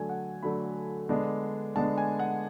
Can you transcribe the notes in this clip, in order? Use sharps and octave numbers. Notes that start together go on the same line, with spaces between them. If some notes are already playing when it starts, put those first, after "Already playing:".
Already playing: D3 F#3 A3 D4 G#5
F#5
D3 F#3 A3 D4 B5
D3 G#3 B3 D4
D3 G#3 B3 D4 A5
G#5
F#5